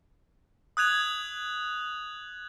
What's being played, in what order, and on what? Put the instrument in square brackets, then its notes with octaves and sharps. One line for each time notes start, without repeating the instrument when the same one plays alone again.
[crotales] D#6 F#6 G#6 F7